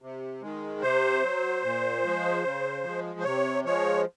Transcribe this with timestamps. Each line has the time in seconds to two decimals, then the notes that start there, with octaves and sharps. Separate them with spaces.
0.02 C3
0.42 D#3 G#3
0.82 C3 C5
1.23 F#3
1.63 A#2
2.03 F3 G#3
2.44 C#3
2.83 F3 G#3
3.20 C5
3.24 C3 C#5
3.65 F3 G#3 C#5